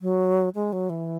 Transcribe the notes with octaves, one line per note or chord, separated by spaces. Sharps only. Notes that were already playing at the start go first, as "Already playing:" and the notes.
F#3
G#3
F#3
E3